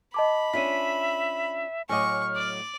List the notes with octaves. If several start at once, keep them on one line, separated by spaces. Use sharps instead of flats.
D#5 A5 B5 D6
C#4 D4 F4 E5 B6 D#7
A2 F#3 D#5 G#5 C#6 D6 F6
D5 D6